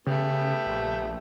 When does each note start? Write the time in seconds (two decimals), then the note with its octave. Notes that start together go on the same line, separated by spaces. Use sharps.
0.06 C#3 A3 B3 G4
0.66 A#1